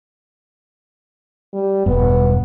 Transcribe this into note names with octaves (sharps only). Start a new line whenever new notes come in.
G3
E1 G2 B3